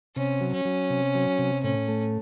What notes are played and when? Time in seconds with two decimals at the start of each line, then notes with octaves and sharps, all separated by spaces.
0.16 C3 C#4
0.41 F#3
0.53 C#4
0.65 F#3
0.90 C3
1.15 F#3
1.39 C3
1.63 A2 C#4
1.88 A3